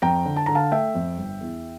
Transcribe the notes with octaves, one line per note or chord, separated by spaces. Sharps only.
F2 G5 A#5
D3
A5
D3 A#5
F5 A5
A3 E5 G5
F2
G1
E2